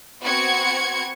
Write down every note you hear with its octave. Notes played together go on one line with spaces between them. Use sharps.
B3 C4 F#4 G#6 C#7